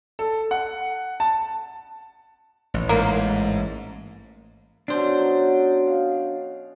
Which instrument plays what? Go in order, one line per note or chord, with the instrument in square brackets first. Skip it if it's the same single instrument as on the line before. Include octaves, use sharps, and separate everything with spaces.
[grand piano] A4
F#5
A5
[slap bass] A1
[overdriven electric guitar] G#2 [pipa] A#3
[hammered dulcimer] B2 C#4 [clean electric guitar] D4 C5
[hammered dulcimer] F#3
C#5 F5